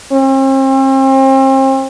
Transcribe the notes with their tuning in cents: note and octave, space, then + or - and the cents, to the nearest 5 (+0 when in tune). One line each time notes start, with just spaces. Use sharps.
C4 +40